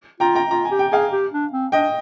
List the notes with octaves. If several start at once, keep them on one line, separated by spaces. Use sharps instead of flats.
F4 G5 A#5
G5 A#5
F4 A#5
G#5
G4
G5
G#4 F5 G#5
G4
D4
C4
D4 D#5 G5